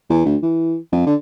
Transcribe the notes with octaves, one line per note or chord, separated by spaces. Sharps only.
E2
D2
E3
F2
D3